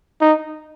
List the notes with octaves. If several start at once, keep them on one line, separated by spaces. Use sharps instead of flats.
D#4